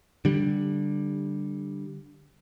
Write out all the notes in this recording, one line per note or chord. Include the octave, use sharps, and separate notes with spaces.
D3 G3